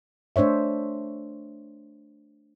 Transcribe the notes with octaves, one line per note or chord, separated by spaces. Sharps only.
A3 D4 C5 C#5 E5